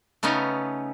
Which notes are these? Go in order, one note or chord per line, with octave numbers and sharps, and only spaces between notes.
C#3 A3 B3 C#4 D#4